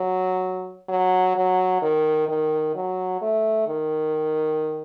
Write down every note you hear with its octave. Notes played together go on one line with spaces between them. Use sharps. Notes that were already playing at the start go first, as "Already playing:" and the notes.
Already playing: F#3
F#3
F#3
D#3
D#3
F#3
A3
D#3